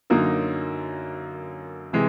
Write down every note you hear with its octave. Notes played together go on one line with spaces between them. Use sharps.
F#2 D3 F#3 A#3 D#4
C3 E3 G#3